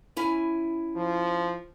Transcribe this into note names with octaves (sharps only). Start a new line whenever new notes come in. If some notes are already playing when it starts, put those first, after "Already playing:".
C#4 E4 G#5
F3